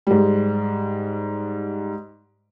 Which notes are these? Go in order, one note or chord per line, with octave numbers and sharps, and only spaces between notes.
G#2 G3